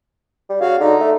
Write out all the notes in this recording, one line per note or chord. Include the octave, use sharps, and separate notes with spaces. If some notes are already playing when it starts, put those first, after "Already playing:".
G3
C#3 F#4 F5
D3 D#4
A3